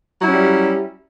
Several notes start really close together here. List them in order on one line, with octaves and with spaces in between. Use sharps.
F#3 E4 C#4 G3